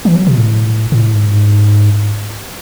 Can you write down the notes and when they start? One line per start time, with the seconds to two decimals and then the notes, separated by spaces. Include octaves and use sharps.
0.05 E3
0.16 F#3
0.27 B2
0.38 A2
0.92 A2
1.14 G#2